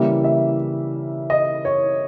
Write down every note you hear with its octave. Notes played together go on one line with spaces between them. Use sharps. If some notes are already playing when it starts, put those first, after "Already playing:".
Already playing: C#3 E3 G3 A#3 E5
E5
D#5
C#5